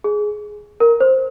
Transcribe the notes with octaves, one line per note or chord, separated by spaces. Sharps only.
G#4
A#4
C5